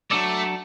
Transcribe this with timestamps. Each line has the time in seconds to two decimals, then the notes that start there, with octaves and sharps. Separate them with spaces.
0.11 F#3 A3 D4 A4 D5